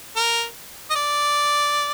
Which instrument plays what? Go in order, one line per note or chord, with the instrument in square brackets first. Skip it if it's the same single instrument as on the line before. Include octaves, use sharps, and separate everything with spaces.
[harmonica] A#4
D#5
D5